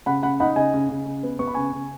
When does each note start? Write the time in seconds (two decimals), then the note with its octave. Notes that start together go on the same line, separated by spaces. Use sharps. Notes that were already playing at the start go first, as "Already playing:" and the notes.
0.06 C#3 F#5 B5
0.23 C#3 F#5 B5
0.40 D#4 F#5 B5
0.56 C#3 D#5 G#5
0.74 C#3
0.89 C#3
1.06 C#3
1.23 B3
1.39 B3 C#6
1.47 B5
1.54 C#3 G#5 C#6
1.72 C#3